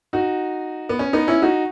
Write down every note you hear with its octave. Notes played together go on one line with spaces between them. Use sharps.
D#4 F#4
B3
C#4
B3 D#4
C#4 E4
D#4 F#4